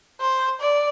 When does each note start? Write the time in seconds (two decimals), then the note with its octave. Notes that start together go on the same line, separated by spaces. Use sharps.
0.20 C5
0.60 D5